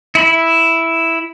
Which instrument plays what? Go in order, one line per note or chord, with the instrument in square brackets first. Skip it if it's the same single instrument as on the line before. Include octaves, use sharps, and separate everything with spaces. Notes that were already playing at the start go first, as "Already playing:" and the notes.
[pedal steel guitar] E4 B5